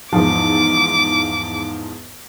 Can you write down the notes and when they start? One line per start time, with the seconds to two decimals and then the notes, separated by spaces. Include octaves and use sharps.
0.13 E2 G#2 F3 D6